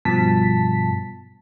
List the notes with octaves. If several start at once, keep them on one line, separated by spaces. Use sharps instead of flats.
G2 B2 F3 A5 B6